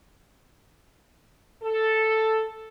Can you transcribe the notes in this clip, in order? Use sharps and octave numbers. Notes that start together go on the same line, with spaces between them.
A4